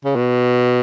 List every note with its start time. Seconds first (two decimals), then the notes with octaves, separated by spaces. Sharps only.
0.04 C#3
0.16 B2